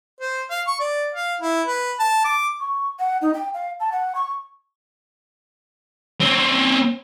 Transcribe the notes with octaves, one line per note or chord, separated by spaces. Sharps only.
C5
F5
C#6
D5
F5
E4
B4
A5
D6
C#6
F#5
D#4
G5
F5
A5
F#5
C#6
C4 C#4